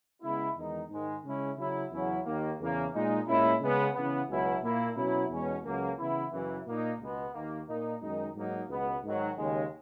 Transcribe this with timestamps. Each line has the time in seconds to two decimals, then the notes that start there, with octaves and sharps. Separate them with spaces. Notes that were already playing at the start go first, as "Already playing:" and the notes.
0.22 C#3 G#3 B3 E4
0.56 E2 D#3 G#3 D#4
0.90 G#2 D#3 G#3
1.24 C#3 G#3 C#4 E4
1.58 C#3 F#3 C#4 E4
1.92 E2 C#3 F#3 C#4 E4
2.25 D#2 D#3 A#3
2.60 E2 C#3 E3 A#3
2.93 A#2 G#3 D#4
3.27 A#2 G#3 C#4 E4
3.61 C#3 G#3 B3
3.95 C#3 E3 B3
4.30 C#2 B2 F#3 C#4 E4
4.63 A#2 A#3 E4
4.96 B2 F#3 C#4 E4
5.30 E2 B2 G#3 C#4
5.65 C#2 C#3 F#3 A#3
5.98 C#3 E3 B3 E4
6.32 F#2 C#3 E3
6.66 A#2 A#3 D#4
7.00 C#2 B2 G#3 B3
7.34 D#2 D#3 A#3
7.68 A#2 A#3 D#4
8.02 F#2 D#3 G#3 D#4
8.36 G#2 F#3 A#3 D#4
8.69 C#2 B2 G#3 B3
9.04 G#2 D#3 F#3
9.37 D#2 C#3 G#3